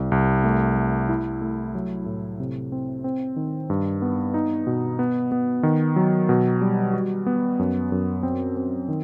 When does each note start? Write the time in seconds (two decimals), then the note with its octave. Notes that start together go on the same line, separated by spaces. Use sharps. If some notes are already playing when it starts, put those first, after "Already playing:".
Already playing: C2
0.12 C2
0.44 A3
0.77 A3
1.09 E4
1.42 A3
1.75 F#3
2.06 A2
2.40 C3
2.72 C4
3.04 C4
3.36 D#3
3.70 G2
4.02 B3
4.34 D#4
4.67 B2
4.99 B3
5.32 B3
5.63 D#3
5.96 F#3
6.29 B2
6.61 G3
6.93 F#4
7.27 B3
7.59 F#2
7.92 F#2
8.23 C4
8.57 C4
8.88 D#3